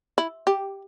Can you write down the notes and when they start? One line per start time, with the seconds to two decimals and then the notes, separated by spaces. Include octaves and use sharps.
0.18 E4
0.47 G4